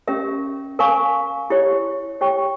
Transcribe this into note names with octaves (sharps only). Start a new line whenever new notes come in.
C#4 G4 A#4 E5
A#4 F5 G#5 C#6
E4 G4 C#5
G4 C#5 G5 C#6